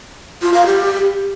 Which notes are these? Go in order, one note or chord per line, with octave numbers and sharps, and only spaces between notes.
F4
F5
G4